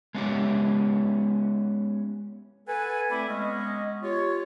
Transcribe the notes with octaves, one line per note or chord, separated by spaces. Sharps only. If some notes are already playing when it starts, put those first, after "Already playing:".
G#3 B3 C#4 E4 G4
A4 B4 F#5 G#5
A3 C4 E4 D5 B5
G#3 B3 C#4 D#5
F4 G4 C#5